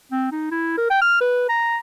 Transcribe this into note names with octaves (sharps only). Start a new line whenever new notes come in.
C4
D#4
E4
A#4
G5
F6
B4
A#5